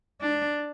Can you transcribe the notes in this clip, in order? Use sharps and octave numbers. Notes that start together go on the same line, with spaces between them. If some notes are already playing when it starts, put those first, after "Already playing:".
D4